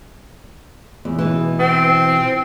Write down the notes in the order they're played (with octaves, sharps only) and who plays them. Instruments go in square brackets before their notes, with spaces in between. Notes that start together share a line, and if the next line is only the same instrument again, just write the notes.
[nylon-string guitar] E2
B2 E3
[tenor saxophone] C4